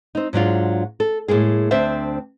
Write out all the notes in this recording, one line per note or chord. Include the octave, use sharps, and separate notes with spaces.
C4 D#4
G#2 F#3 D4 F4
A4
A2 G#3 A#3 G#4
D2 C4 D4 C5 E5